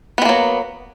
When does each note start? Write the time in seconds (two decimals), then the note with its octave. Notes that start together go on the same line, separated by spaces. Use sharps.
0.18 B3
0.22 G#3
0.25 A#3
0.29 F#3